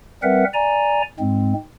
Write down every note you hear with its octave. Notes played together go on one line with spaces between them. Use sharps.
G3 C4 A#4 B4 E5 F#5
D5 G#5 A#5
G#2 G#3 C4